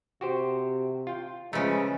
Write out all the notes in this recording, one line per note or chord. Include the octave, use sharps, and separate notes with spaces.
C3 F#4 G4 C5
F4 G5
C#3 F3 G#3 A3 B4 A#5